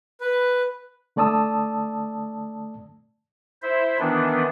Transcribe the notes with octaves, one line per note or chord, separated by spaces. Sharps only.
B4
D3 A3 D5 A5 D#6 E6
E4 C5 E5
D#3 E3 B3 D4